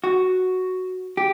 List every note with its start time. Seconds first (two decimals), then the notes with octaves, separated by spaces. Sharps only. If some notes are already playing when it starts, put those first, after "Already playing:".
0.04 F#4
1.17 G4